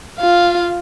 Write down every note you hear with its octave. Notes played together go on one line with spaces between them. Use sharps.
F4 F5